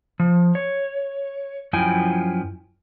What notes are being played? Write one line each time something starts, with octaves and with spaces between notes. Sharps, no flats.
F3
C#5
F#2 F3 E4 G5 G#5